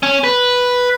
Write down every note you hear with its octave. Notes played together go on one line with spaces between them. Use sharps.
C#4
B4